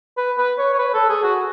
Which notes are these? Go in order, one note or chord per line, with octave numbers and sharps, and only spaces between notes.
B4
B4
C#5
C#5
B4
A4
G#4
F#4